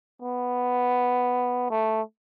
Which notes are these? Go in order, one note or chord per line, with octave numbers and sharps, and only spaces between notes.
B3
A3